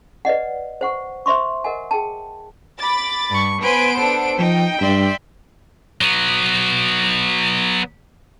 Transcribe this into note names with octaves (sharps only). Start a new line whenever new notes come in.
B4 D5 D#5 F#5
C5 F#5 C#6
C5 E5 C6 C#6
A#4 D#5 F#5 G#5
G#4 G5 A5
B5 D6 A6
G2 C#6
B3 B4 C5 G#5 C6 D7
D4 A4
F3 D#4 G5
G2 D5 E5 C6
F#3 B3